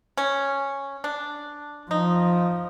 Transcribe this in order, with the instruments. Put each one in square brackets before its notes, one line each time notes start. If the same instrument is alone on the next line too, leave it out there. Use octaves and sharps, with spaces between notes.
[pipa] C#4
D4
[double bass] F3 [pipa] D#4